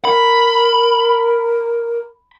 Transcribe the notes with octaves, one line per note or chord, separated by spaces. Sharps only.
A#4 B5